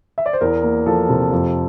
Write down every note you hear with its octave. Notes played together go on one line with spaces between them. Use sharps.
E5
D5
C5
E2 A#4
A#3
F3 A4
C3
F2